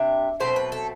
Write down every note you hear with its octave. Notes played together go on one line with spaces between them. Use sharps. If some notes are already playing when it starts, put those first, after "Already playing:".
Already playing: C3 G3 D4 E5
B2 F#3 A3 C4 C5
B4
A4